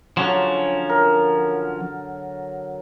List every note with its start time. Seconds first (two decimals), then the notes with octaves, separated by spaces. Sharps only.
0.17 D3 F3 F#3 C#4
0.89 A#4